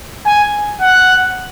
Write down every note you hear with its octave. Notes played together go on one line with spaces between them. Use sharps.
G#5
F#5